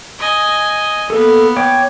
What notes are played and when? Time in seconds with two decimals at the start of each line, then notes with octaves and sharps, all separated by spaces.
0.19 D#5 G#5
1.10 A#3 B3 A4
1.56 C#5 G5 D6